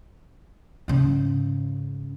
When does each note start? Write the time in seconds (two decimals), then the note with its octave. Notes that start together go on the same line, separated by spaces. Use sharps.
0.88 G#2 C#3